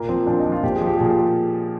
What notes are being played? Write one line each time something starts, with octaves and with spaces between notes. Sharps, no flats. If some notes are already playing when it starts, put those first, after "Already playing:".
Already playing: A#2 A#3
F3 C4
A#2 D4
D#4
F3
F4
A#2 G4
G#4
F3 G4
A#2 G#4
G4